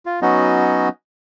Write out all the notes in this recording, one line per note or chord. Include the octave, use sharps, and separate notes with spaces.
F4
F#3 B3 C#4 D#4 F#4 D#5